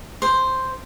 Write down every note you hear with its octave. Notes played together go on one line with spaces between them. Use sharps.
C5